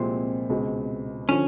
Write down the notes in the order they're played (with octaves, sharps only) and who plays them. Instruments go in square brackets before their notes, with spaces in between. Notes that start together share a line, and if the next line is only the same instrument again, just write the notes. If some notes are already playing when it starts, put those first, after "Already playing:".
Already playing: [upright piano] C2 A#2 F3 G#3 [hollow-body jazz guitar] C4
[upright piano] C#2 B2 G#3
[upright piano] D3 F3 [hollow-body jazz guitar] C#4